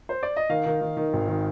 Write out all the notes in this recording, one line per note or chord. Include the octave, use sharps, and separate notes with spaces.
C5
D5
D#5
D#3 F5
D#3
D#3
D#3
G#1
D#3